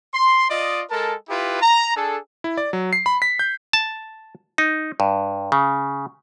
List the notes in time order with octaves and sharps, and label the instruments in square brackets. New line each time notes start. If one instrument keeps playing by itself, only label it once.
[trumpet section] C6
F4 D5 D#5
G#3 A4 A#4 A5
E4 F4 G4 B4
A#5
D4 G#4 A4
[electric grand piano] E4
D5
F#3
C7
B5
B6
G6
[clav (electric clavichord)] A5
D#4
G2
C#3